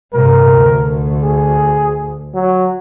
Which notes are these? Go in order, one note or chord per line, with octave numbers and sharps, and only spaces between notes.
G2 C3 A#4
D2
G#4
F#3